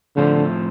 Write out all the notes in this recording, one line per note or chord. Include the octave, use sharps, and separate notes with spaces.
A2 D3 F3 C4